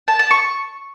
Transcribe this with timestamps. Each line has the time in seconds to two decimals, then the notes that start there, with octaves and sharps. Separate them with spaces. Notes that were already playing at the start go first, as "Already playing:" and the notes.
0.08 A5
0.19 A5
0.31 C#6